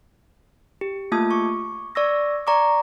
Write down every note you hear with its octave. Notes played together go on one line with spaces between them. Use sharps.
G4
A3 A#3 F4 A5 D#6 G#6
C#6 D6
D5 C#6 E6 A#6
D5 A#5 C#6 D6